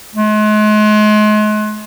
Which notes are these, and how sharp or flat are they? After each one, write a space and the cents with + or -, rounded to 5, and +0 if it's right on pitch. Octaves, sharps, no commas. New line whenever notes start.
G#3 +40